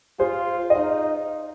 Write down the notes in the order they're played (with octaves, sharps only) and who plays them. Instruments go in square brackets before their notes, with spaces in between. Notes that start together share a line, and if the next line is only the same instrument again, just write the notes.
[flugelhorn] F4 [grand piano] G#4 C5
[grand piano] D#5
[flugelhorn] D#4 [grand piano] C5 F5